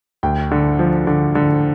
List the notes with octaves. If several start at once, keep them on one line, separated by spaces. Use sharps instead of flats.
D2 G5
D3
F3
D3
D3